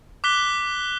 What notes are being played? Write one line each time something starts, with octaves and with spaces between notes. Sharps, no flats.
D6 F#6 B6 G7